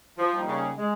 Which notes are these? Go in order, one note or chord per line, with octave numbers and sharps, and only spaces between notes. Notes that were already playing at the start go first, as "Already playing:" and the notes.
F3
G3 A#3 D#4
C#3
G#3